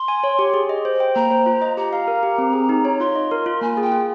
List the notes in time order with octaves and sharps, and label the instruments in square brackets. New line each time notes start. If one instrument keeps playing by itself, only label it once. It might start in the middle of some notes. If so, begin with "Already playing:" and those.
Already playing: [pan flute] C6
[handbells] G#5
C#5
G4
G#4
D#5
C5
G5
[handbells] A#3 [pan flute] A#5
[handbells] C5
F4
D#5
[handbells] G4 [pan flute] A#5
[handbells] F5
A#4
G4
C4
G#4
D#4
C#5
[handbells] F4 [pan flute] C6
[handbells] D#5
A#4
F4
[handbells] A#3 [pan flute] G#5
[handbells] G#4 [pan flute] G5
[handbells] F4